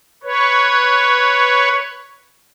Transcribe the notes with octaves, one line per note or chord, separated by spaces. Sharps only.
B4 C#5